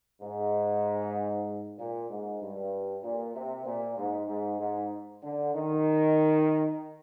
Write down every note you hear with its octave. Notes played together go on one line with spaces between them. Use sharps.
G#2
A#2
G#2
G2
A#2
C3
A#2
G#2
G#2
G#2
D3
D#3